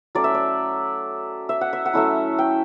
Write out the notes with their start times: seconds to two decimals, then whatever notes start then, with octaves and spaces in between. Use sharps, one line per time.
0.15 F#3 A3 C#4 D5
0.24 E5
0.34 D5
1.49 E5
1.61 F#5
1.73 E5
1.85 F#5
1.93 F#3 A3 C#4 E4 E5
2.39 G5